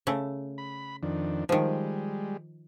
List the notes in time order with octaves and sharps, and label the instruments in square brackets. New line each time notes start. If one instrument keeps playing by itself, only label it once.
[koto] C#3 A3
[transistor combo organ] B5
F2 D#3 D4
[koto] D#3 F3 [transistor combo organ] G3 G#3